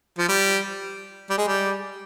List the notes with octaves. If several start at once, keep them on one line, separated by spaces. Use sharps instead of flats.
F3
G3
G3
G#3
G3